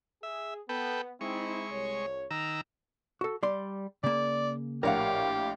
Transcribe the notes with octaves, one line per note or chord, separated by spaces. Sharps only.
G#4 E5
B3 A4 B4 G5
G#3 C4 D#4 E4 C#6
C2 C#5
D#3 A#5 E6
F#4 A4
G3 D5 C6
C#3 A#3 D5
A#1 A2 G4 A#4 C#5 F5 F#5